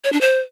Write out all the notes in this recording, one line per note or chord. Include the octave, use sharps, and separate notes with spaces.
C#5
D4
C5